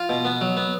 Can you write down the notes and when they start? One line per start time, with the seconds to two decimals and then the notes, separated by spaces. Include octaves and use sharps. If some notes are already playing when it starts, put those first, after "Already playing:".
Already playing: F4
0.09 B2
0.25 B3
0.41 F#3
0.57 B3